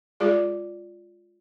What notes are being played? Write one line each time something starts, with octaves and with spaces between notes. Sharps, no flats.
G#3 F4 G#4 D5 D6